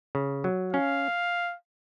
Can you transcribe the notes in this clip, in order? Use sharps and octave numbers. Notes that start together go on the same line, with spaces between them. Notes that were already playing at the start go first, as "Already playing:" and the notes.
C#3
F#3
C#4 F5